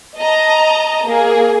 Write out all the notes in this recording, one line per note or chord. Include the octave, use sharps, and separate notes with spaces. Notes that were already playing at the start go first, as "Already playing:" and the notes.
D#5 A5 A#5
A#3 G#4